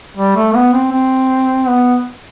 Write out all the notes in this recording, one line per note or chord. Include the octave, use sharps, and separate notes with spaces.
G3
A3
B3
C4
C4
B3